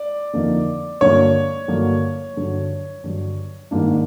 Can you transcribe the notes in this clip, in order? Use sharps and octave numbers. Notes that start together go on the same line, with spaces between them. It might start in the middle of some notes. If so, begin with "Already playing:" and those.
Already playing: D5
F2 D3 F3 A#3 D#4
G2 D3 F#3 A#3 C#5
G2 D3 F#3 A#3
G2 D3 F#3
G2 D3 F#3
G#2 D#3 G3 A#3 D4